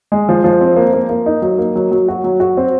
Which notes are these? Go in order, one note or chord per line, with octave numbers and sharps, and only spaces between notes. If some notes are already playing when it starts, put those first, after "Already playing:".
G#3
F3
F3
C4
A#3
A#3
A#3
D#4
F#3
A#3
F#3
F#3
F#4
F#3
F#4
C4